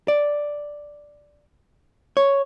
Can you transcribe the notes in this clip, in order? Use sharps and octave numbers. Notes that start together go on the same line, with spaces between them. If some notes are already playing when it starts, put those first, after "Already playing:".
D5
C#5